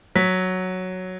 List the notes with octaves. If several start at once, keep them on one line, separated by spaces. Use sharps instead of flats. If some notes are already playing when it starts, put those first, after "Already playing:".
F#3 B6